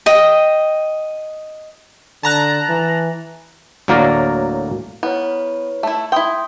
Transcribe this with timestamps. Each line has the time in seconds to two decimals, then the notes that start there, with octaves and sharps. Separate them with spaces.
0.06 D#5 G5
2.23 D3 A5 A#5 F#6
2.69 E3
3.88 D2 A2 F#3 A#3 A#4 D5
5.03 B3 E4 B4 C#5
5.83 A3 E4
6.12 E4 E5 G5 C6 D#6